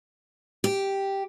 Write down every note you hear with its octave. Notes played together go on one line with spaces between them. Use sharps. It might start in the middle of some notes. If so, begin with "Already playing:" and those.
G4